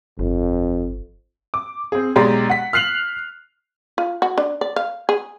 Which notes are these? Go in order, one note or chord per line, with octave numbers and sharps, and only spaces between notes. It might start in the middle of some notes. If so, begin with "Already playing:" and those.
G1 F2
D6
C4 G#4
B1 G#3 G4 D5 A#5 C6
F#5 B6
F6 F#6 C7 F7 F#7
F4
F#4
D4
D5
F5
G#4